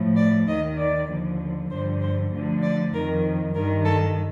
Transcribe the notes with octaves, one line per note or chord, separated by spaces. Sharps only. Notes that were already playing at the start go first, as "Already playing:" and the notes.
Already playing: A2 F3
D5
D#2 D#3 D#5
D5
D#2 D3 F3
G2 D3 F3 C5
C5
D2 D3 F3
D5
F2 D#3 A#4
G2 D#3 A#4
A4